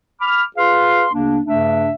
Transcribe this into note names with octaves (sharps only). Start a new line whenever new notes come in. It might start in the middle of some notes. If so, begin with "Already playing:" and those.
B5 D6 F6
F4 G#4 B4 F5 C6
D2 C#3 A#3 D4
G2 C#3 A3 D4 E5